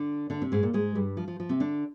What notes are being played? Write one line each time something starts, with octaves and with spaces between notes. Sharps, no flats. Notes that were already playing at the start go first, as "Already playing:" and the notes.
Already playing: D3 D4
D3 D4
C3 C4
G#2 G#3
A#2 A#3
G#2 G#3
G2 G3
F3
F3
F3
C3 C4
D3 D4